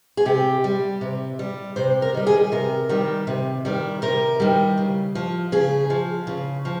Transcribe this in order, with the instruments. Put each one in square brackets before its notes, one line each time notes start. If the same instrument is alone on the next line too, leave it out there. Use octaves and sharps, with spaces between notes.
[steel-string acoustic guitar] G#4
C3 G4
G3
C3
G3
C3 C5
A#4
D#3 G3
G#4
C3 A#4
D#3 G3
C3
D#3 G3
C3 A#4
D#3 G3
C#3
F3
C#3 G#4
F3
C#3
F3